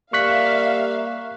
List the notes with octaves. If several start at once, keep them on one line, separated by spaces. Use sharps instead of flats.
G3 A#3 E5 F5 C#6 F#6 B6